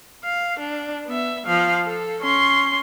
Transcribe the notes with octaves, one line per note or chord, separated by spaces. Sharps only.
F5
D4
B3 E5
F3 F5
A4
C#4 C6